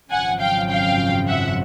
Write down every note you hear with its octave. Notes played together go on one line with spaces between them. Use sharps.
G#1 F#2 C#3 F3 F#5 G#5
F5 G5
F5 G5
E5 F#5